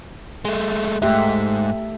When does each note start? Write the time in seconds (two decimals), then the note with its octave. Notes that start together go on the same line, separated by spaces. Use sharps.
0.45 G#3 A3
1.02 G#2 A3 G4 E5